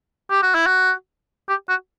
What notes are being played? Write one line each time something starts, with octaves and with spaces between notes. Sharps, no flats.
G4
F#4
E4
F#4
G4
F#4